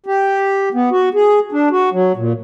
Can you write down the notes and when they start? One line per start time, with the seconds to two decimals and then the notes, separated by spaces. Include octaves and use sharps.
0.06 G4
0.74 B3
0.92 F#4
1.14 G#4
1.52 D4
1.71 F#4
1.92 F#3
2.17 A#2